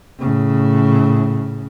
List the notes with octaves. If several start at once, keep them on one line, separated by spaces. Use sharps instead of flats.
A2 C#3